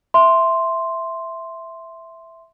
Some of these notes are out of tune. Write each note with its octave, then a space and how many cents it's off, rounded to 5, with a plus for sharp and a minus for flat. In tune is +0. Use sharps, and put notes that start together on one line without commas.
E5 +0 C6 +0